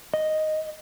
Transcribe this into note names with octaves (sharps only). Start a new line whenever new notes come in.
D#5